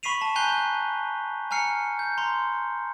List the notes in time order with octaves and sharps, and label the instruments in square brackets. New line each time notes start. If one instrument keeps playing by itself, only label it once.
[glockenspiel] B5 C#6 B6 C7 D#7 F7
A5
G#5 A#5 F#6 G6 C7 G7
G#5 A#5 F6 C7 C#7
G6
A#5 C6